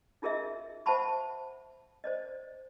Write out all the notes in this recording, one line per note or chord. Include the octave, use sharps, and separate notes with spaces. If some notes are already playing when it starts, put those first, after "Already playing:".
D#4 F4 G#4 A#4 D#5 E5
C5 E5 F#5 A5 B5 C#6
C5 D5 D#5